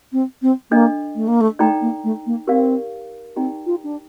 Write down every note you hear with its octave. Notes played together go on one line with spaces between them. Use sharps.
C4
C4
A#3 D4 A4 D#5
A3
A#3
A3
A3 D#4 A4 D5 G5 A#5
A#3
A3
A#3
C4 G4 A#4 D5 F5
C4 D#4 G4 D5 G5 A#5
F4
D4